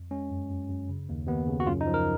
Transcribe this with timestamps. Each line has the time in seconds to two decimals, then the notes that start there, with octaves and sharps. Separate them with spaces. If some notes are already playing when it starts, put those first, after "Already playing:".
Already playing: F2
0.11 G#3 C#4
0.31 F#2
0.50 F#2
0.69 F#2
0.89 C#3
1.09 D#2
1.28 D#2 B3
1.47 C#3
1.60 F#4
1.67 F#2 F4
1.81 D#4
1.87 F3
1.94 A#4